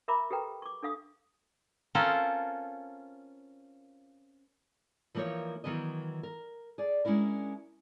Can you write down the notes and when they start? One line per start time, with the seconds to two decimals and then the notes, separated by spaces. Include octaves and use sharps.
0.08 A#4 E5 A#5 B5 D6
0.31 G4 A4 B4 G5 A#5
0.62 C#6 D6
0.83 D4 A4 F5 D#6
1.95 C4 C#4 F4 A4 A#4
5.15 E3 F3 A#3 D#4 A#4 C#5
5.64 D#3 E3 F#3 B3 D#5
6.23 A#4
6.78 G#4 D5
7.05 G#3 C#4 D4 E4 A#4